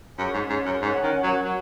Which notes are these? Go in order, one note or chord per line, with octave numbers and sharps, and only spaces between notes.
F#2 C#4 G#4 C#5
G#2
G#2
F#2
G#2 C#4 A#4 C#5 F#5
D#3
F#3
F#3